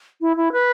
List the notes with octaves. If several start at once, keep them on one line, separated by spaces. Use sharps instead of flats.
E4
E4
B4